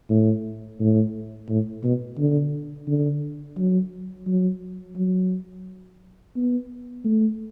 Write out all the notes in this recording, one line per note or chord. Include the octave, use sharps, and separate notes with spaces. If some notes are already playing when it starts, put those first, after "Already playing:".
A2
A2
A2
B2
D3
D3
F#3
F#3
F#3
B3
A3